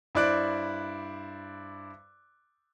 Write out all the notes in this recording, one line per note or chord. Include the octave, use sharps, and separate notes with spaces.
G2 E4 C5 D5 F#6 D7